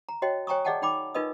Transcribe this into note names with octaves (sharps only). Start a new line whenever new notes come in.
A#5
F#4 C#5 D#5 G5
C#5 G5 G#5 A#5 C#6 D#6
G#4 D5 D#5 F#5 G5 A5
D#4 G5 B5 D6
D#4 F4 A#4 B4 D#5 D#6